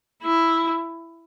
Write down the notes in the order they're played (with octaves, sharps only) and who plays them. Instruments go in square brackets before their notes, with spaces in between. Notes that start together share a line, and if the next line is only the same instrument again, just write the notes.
[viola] E4